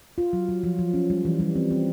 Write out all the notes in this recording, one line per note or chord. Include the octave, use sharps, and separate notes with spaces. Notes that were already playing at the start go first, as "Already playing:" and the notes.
F4
F#3
F#3
F3
F3
C#4
G3
E3
G3
C4
C4